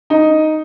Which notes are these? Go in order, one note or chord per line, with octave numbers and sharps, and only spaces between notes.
D#4